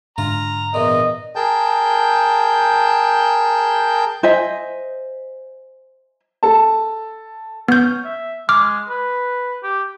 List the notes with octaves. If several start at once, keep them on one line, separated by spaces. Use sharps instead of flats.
G#2 D3 D4 F4 A#5
E2 A#2 D#5
G#4 A#4 G5 A5 G6
C5 D#5 E5 G#5
A4 A5
B3 C#4 G6
E5
G#3 D6 F6
B4
G4